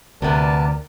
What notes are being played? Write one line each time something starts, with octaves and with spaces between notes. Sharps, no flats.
D2 C3 B3 A#4 D5 A5